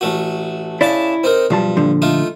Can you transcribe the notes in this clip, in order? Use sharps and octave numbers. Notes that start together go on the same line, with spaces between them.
A1 A3 F#4
C#3 E4 D5 A5 D6
C4 D#4 A#4
B1 G2 F3 A5
A#2 D3 F3
A3 D#4 F4